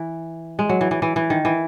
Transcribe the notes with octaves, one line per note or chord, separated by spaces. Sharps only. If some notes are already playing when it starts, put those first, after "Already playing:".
Already playing: E3
G#3
F#3
E3
E3
E3
E3
D#3
E3